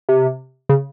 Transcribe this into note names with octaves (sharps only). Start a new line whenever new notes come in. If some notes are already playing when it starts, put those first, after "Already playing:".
C3
C#3